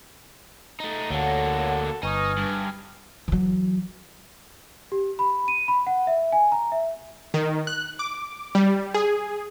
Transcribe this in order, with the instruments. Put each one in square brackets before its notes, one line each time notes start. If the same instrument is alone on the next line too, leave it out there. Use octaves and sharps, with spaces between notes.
[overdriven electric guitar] A3 D#4
[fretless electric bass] D2 [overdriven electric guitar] D3 A#3 [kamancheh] F#4 A4 [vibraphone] C#5 F#5
[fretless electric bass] G1 [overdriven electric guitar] D#4 [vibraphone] B4 C#6 D#6 [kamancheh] G#5 F6
[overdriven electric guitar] G2
[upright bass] E3 F#3
[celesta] G4
B5
D#7
B5
F#5
E5
G#5
A#5
E5
[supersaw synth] D#3
F#6
D6
G3
G#4